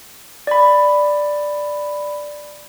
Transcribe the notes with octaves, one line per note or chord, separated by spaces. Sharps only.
D5 B5